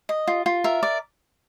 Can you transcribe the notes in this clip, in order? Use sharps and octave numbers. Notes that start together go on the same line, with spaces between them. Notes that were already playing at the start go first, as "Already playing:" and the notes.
D#5
F4
F4
A#4 E5
D5